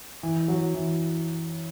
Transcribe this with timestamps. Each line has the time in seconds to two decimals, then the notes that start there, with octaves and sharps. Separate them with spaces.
0.23 E3
0.48 F#3
0.74 E3